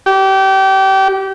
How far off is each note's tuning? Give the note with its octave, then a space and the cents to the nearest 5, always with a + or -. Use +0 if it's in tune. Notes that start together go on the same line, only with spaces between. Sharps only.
G4 -25